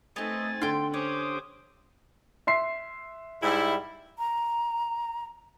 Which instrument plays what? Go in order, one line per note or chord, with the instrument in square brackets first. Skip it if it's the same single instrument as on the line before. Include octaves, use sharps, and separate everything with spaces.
[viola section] A3 C4 D#4 [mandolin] B3 D#5 [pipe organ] G#5 A6
[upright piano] D3 [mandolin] G5 C6
[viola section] C#4 G4 [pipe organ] C5 D6 D#6 [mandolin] C#5
[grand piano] E5 C6 C7
[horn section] G#2 G3 E4
[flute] A#5